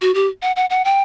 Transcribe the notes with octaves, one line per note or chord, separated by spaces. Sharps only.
F#4
G4
F#5
F#5
F#5
G5